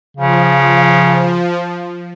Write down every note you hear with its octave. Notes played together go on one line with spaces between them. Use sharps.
C#3 F3